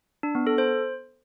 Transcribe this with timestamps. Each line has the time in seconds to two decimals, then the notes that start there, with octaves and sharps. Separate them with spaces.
0.23 D4
0.35 B3
0.47 A4
0.58 C5